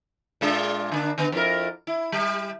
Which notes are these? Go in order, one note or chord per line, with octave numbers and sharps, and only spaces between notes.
A#2 G#3 D4
D3 A#3 D4
D3 B3
F2 E4 A#4
E4
G3